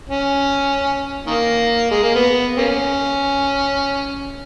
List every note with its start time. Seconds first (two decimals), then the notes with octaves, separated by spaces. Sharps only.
0.10 C#4
1.27 D#3 A#3
1.91 G#3
2.03 A#3
2.15 B3
2.58 A#3 C#4